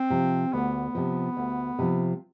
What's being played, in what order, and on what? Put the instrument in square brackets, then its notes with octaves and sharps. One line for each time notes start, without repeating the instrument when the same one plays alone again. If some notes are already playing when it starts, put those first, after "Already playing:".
Already playing: [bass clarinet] C4
[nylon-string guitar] C3 F3
[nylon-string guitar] D2 [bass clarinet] B3
[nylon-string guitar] C3 F3
D2
C3 F3